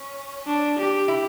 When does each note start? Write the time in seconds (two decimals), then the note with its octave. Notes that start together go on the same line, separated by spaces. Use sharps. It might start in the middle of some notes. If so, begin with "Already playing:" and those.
Already playing: C#4
0.47 D4
0.78 G4
1.08 E4